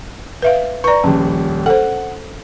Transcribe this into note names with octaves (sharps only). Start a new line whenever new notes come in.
B4 E5 F5
B4 D5 A#5 C#6
D#1 A#1 C#4
A4 C5 F#5